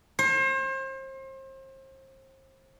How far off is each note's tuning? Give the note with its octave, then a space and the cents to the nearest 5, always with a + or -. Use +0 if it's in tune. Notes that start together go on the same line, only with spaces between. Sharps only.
C5 +35